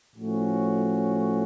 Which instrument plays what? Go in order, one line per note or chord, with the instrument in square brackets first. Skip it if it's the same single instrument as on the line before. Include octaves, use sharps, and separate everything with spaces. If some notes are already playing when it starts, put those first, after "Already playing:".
[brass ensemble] A2 F3 A3 C#4 F#4